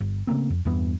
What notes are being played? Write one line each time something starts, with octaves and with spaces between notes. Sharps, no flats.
G1
C#3 A3 A#3 C4
F2
E2 G2 E3 B3